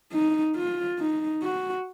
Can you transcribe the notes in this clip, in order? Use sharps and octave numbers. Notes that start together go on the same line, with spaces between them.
D#4
F4
D#4
F#4